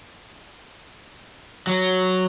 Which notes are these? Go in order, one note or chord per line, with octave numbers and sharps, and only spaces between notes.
F#3